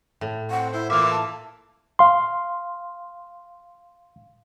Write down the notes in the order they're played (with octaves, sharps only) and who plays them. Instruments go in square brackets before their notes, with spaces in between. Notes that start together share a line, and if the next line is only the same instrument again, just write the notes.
[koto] A2
[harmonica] C4 [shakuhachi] F#5
[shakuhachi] E4 [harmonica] C5
[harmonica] E3 A#3 F4 [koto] E5 F5 [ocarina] D6
[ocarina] A5
[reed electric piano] F5 C6